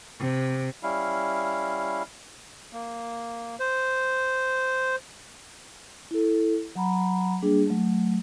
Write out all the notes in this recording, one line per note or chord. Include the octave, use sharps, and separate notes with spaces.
C3
G3 C#4 E4 F5
A#3
C5
E4 A4
F#3 F#5 A#5 B5
G3 A#3 D4 G#4
F#3 A3